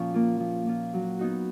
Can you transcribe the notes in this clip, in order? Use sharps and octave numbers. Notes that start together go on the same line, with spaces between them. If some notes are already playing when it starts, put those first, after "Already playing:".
Already playing: A#2 F3 C#4
A#3 F4
F3
A#3 F4
F#3
B3 D#4 F#4